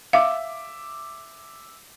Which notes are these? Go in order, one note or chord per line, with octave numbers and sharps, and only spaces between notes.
E5 F5 D6